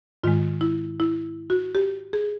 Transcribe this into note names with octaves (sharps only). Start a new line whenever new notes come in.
G#2 D#3 G#3 F4
E4
E4
F#4
G4
G#4